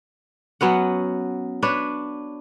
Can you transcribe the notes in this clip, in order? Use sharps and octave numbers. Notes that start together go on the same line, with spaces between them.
F#3 B3 C#4 F#5
D4 B4 C#5